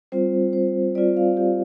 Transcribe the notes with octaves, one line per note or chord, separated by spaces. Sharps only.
G3 C4 F4 C5
C5
G3 C4 F4 D5
F5
G4